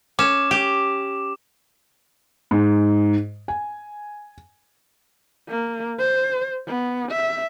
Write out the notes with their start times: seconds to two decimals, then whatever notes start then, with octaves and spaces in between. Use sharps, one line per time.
0.19 C#4 D6 E7
0.51 G4
2.51 G#2
3.48 G#5
5.49 A#3
5.99 C5
6.67 B3
7.12 E5